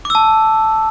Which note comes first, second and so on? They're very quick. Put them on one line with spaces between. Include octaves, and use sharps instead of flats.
D6 E6 A5